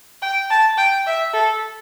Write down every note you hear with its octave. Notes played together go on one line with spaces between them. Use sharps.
G5
A5
G5
E5
A4